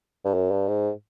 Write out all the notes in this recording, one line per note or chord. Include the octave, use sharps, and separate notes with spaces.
G2
F#2
G2
G#2